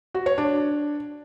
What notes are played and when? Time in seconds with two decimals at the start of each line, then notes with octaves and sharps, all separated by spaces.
0.14 F#4
0.26 C#5
0.38 D4